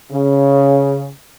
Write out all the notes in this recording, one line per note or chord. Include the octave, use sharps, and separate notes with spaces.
C#3